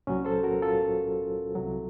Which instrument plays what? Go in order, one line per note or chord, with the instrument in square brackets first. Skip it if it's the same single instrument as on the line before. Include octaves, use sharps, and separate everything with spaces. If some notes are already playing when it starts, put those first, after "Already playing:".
[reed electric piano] C2 A#2 F#3 C#4
A4 C5
F#4 A#4
F4 A4
C2 C3 F#3